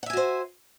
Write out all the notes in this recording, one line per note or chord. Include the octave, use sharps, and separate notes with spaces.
F#4 C5 E5 F#5 G#5